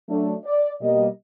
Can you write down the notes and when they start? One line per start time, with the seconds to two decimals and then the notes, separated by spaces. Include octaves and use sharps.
0.09 F#3 A3 D4
0.45 D5
0.81 B2 G3 A#3 D#5